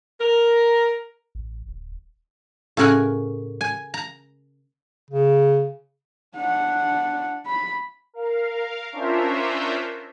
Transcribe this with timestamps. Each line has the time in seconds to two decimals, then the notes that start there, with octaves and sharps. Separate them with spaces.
0.20 A#4
1.35 A1
1.69 D1
2.77 A2 C#3 C#4 A#4 F#5 G#5
3.61 G#5
3.94 A#5
5.10 C#3
6.36 D4 F#5
7.46 B5
8.13 A#4 F5
8.92 C#4 D4 F4 A#4 C5 E5